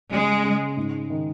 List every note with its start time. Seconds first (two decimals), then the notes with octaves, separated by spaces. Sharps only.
0.11 C#3 G#3
0.44 C#3
0.77 G#2
1.10 D#3